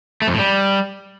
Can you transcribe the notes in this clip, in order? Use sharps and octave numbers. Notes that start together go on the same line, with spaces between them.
A3
F2
A2
G3